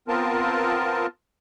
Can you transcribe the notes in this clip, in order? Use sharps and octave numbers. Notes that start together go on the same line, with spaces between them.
B3 C4 F4 A#4 A5